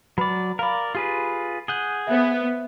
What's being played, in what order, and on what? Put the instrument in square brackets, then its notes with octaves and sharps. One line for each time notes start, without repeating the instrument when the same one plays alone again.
[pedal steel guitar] F#3 D5 [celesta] B4 B5
[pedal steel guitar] A#4 D5 [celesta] F5 B5
[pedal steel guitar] F4 G#4 B4 [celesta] G4
[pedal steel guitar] G#4 F#5 [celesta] G6 D#7 G7
[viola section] B3 [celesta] C5 E5